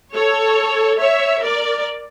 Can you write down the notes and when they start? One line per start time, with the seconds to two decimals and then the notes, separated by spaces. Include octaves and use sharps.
0.14 A4 C#5
1.00 C#5 E5
1.42 A#4 D5